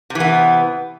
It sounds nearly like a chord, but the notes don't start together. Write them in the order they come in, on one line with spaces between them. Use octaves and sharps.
C3 E3 B3